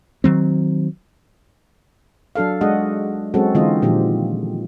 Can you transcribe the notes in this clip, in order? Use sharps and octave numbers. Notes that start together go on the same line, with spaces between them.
D#3 F#3 C4
F#3 D4 A4 F5
G#3 D4 F#4 D#5 F#5
F#3 G#3 C4 C#4 F#4 A4
D3 E3 G#3 C4 F4 D#5
A#2 D#3 F3 G4